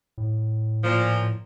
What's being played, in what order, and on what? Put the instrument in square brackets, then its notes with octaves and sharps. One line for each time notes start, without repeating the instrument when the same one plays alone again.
[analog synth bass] A2
[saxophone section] A#2 F3